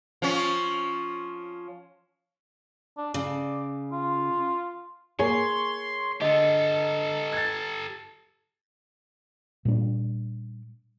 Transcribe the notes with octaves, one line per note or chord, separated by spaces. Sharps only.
F3 C#4
D4
C#3 D5
F4
A#3 G#4 C#5 C6
D3 G4 A4 D#5
G#6 A6
A#2 G3 D4